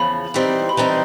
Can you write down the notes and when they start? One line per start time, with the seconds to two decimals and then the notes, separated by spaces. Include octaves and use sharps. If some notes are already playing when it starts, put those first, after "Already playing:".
Already playing: E2 C#3 F3 B5
0.34 E3 G3 C4 D#4
0.69 B5
0.77 E3 G3 C4 D#4 A#5